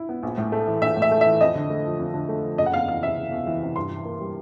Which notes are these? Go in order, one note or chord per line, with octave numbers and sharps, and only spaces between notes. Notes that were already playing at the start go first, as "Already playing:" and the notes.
Already playing: E4
B3
A#1
A2
A3
E3
A#1 E5
A2
E5
A3
E5
E3
F2 D#5
D3
A3
F3
F2
D3
A3
F3
F#1 D#5
F#5
E2 F5
E3 F5
C3 E5
F#1
E2
E3
C3
G2 C6
E3
A#3
G3